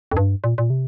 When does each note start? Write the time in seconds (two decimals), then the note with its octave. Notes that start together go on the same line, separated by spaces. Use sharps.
0.11 F2
0.17 G2
0.44 A#2
0.58 A#2
0.70 C3